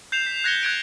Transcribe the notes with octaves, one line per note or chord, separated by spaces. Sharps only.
G6 C7 E7 F7
B6
F#6 G#6 A#6 C7 C#7 G7
F#6 G#6 D7